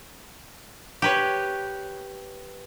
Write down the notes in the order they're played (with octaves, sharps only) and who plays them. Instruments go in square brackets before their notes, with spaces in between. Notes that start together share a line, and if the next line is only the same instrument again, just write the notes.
[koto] G4 B4 C#5